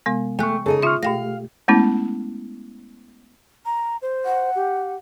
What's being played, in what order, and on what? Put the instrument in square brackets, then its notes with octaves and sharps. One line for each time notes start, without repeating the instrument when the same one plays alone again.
[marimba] C3 G#3 B3
[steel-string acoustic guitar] A3 [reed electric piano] G5 C#6 [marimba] G#5 F#6
[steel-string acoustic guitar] C#3 D#4 D#5 [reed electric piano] G#4 A4
[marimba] F4 E5 [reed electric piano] C6 C#6 F6
[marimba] B2 G5 A#6 [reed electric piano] A3 G4 [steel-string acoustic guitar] F5
[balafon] G#3 A3 B3 C#4 E4
[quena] A#5
C5
[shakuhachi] F#5
[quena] G4